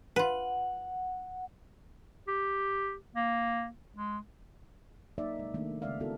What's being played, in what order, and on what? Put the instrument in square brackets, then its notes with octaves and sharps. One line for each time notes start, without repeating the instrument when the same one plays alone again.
[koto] F4 B4 [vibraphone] F#5
[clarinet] G4
A#3
G#3
[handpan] F#3 A#3 D#4 D5 E5
C3 G#3
D#3 A3 A#3 D4
C#3 G#3 C#4 D5 E5 F5
B3 C#4 E4 F#4 A4 A#4